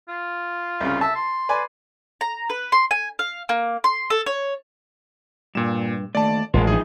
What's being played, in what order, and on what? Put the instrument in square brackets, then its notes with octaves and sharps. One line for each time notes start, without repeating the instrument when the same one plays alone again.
[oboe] F4
[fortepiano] C2 C#3
[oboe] E5 [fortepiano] A5
[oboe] C6
[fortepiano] B4 D5 G#5
[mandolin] A#5
B4
C6
G#5
F5
A#3
C6
A4
C#5
[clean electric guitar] G2 [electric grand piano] A#2 E7
[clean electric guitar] D#2 A3 [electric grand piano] D5 A5
[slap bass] A1 A2 [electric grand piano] G#3 F4 [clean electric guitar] A#4 C5 F#5
[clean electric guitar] E3 F3 D#4 [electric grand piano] G#4